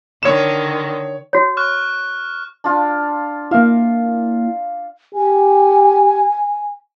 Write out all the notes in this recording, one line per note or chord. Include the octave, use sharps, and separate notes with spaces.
D3 D#3 C#5 E7
F#4 C#5
C#6 F6 F#6
D4 F4
A#3 E4 F5
G4 G#5